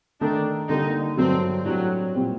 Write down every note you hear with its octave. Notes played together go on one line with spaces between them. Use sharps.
D#3 A3 D4 D#4
D3 G3 A#3 D#4
G2 D3 F#3 C4
A2 F#3 G3 D4
A#2 G3 C4